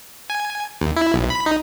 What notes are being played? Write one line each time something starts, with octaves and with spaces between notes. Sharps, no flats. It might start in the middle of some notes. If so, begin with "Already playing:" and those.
G#5
D#2
E4
B1
B5
D#4